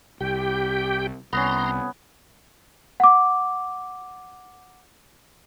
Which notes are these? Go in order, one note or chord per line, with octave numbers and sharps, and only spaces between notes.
C2 G4 G5
C2 B3 C#4 A#5 C6
F#5 D6